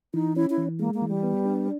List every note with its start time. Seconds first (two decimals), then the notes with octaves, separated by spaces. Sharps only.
0.14 E3 D#4
0.36 C#4 E4
0.50 E4
0.58 E3
0.79 G#3 A#3
0.94 A#3
1.02 E3
1.08 G3
1.23 B3
1.45 D4